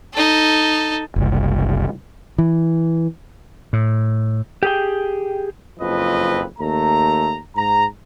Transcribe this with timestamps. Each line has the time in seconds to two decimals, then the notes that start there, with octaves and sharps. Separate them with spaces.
0.14 D#4 A4
1.16 F#1 C2
2.38 E3
3.73 A2
4.63 G4 G#4 G5
5.79 F#1 F2 F3 B4 D#5
6.58 D#2 A3 A#5
7.55 G#2 A#5